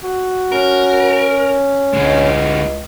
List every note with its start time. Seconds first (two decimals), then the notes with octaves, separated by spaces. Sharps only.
0.03 F#4
0.52 C#4 A#4
1.93 C#2 D3 G#3